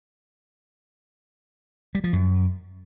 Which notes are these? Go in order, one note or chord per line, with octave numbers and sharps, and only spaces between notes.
G3
F3
F#2